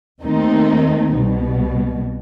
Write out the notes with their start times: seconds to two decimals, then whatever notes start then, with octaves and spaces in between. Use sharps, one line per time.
0.20 D#2 D#3 A3 C4 D#4
1.12 C2 B2 G3